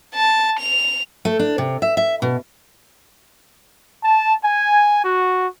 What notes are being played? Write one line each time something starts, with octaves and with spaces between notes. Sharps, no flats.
A5
F7
A3
D4
C3
E5
E5
B2
A5
G#5
F#4